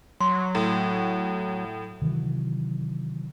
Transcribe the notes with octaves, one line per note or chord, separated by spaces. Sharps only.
F#3 C6
A2
C3 D#3 E3 F#3